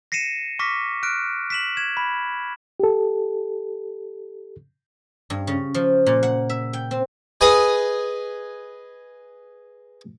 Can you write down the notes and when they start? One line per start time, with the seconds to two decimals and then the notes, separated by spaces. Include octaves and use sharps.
0.12 A#6 C7 C#7 D#7 E7
0.59 C#6 D6 F6 A#6 B6
1.03 F6 F#6 D7
1.50 B6 E7 F#7
1.77 G#6 E7
1.97 B5
2.80 G4 A4
5.30 G2
5.47 C#3
5.74 F3
6.06 A#2
6.23 F#5
6.49 E5
6.73 G5
6.91 C4
7.41 G#4 B4 D#5 G#5 D#6